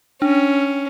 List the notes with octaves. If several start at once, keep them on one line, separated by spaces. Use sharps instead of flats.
C#4 D4